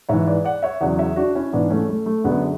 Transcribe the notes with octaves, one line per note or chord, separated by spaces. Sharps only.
G#2 E3 C#5 E5
B4 D5
D5 F#5
C#5 E5
E2 C#3 F#3 D5 F#5
C#5 E5
D4 F#4
C#4 E4
G#2 E3 B3 D4
A3 C#4
A3
A3
F#2 D3 F#3 G#3 B3